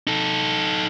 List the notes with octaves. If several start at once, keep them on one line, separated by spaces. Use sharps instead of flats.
D#4 A4